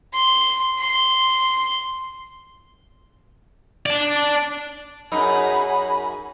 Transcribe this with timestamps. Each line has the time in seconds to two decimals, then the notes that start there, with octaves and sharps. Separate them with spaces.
0.13 C6
0.79 C6
3.86 D5 A5
5.12 F#2 D#4 G#4 F#5 G#5 B5